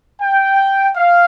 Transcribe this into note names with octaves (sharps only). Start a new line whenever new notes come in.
G5
F5